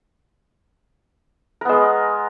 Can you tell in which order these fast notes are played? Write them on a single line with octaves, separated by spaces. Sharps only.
A#4 B3 G#3